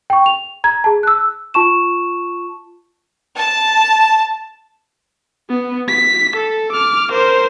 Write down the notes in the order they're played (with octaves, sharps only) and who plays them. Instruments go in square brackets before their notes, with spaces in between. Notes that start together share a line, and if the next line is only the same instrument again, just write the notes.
[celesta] G5 C#6
F7
A#5 G#6
G#4 A5
E6 F#6
F4 A5 C#6 E7
[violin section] A5
[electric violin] B3
B6
A4
D6 F6
A#4 C5